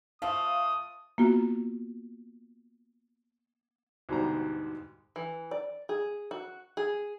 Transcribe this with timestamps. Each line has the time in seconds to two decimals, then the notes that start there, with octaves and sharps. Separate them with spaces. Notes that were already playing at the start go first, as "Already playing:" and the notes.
0.22 F3 A3 F5 D#6
1.18 A#3 B3 F4 F#4
4.09 D2 G#2 B2 G3 C5 A#5
5.16 E3
5.51 D5
5.89 G#4
6.31 F#4
6.77 G#4